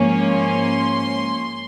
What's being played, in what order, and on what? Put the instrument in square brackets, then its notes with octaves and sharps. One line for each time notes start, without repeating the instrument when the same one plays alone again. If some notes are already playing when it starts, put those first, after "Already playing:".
Already playing: [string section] G#2 F3 A#3 C#4
C6